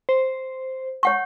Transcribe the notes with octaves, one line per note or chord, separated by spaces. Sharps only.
C5
C#5 F#5 C#6